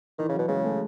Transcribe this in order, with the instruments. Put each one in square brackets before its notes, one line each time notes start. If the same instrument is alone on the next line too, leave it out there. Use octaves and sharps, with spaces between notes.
[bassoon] D#3 [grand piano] E3
[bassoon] C#3 [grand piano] F#3
[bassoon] B2
[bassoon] C#3 [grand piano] G#3
[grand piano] A3